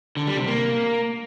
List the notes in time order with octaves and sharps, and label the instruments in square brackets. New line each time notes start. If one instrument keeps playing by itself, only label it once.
[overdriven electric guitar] D3
G3
C3
A#3